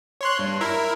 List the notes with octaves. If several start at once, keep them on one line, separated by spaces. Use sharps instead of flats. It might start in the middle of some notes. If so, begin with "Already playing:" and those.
C#5 C6 F#6
G2
E4 A#4 E5